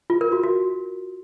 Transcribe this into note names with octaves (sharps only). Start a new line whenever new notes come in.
F4
A#4
F#4
F#4